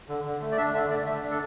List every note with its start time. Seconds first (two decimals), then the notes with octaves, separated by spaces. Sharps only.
0.09 D3
0.25 D3
0.41 A3
0.52 D5
0.57 D4 E5
0.73 D3 E5
0.90 D3 D5
1.06 A3 E5
1.23 D4
1.31 A4